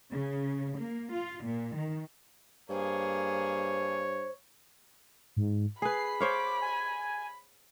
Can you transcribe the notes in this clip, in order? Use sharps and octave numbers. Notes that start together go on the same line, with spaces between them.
C#3
A#3
F4
A#2
D#3
G2 A#3 G#4 C5 C#5
G#2
G#4 B4 B5 C7
C5 C#5 F5 D6
G#5